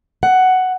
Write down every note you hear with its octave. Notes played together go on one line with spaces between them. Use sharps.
F#5